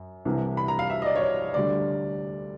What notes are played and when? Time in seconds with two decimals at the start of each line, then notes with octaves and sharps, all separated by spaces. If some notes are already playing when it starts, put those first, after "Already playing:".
Already playing: F#2
0.25 C2 C3 E3 G3
0.57 B5
0.68 A#5
0.79 F5
0.90 E5
1.02 D#5
1.06 D5
1.16 C#5
1.22 D5
1.54 D2 D3 G3 D5